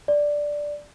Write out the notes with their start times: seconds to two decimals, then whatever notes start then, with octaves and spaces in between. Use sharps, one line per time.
0.08 D5